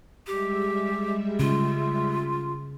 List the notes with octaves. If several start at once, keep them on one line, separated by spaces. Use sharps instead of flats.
G3 G#3 G4 E5
C#3 F4